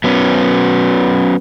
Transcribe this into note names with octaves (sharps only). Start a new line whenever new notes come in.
F#3 B3 C#4